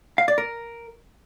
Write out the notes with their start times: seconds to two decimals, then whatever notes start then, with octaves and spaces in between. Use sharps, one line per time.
0.18 F5
0.28 D5
0.38 A#4